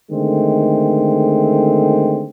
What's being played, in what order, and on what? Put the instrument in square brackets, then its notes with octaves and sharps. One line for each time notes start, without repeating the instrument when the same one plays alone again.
[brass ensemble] D3 D#3 G#3 A3 C4